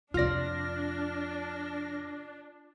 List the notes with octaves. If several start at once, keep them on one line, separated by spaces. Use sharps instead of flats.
F2 C3 D4 F4 D5 F6 A#6